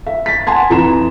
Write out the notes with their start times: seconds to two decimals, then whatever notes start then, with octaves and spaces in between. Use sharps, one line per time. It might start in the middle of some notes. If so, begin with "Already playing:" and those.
0.07 E5
0.26 A6 B6
0.47 F#5 G#5 A5 C6 G#6
0.70 F2 E3 A#5 C6 E7